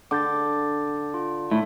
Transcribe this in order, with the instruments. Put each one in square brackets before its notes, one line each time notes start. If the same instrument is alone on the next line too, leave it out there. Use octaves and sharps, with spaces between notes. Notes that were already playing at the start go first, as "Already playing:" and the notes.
[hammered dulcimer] D3 [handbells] D6 G6 A6
[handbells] F4
[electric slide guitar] A2 [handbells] E5